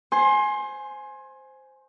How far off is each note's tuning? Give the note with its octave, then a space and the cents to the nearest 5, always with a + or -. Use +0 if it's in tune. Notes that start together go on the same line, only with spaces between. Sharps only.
C5 +0 G#5 +10 C6 +30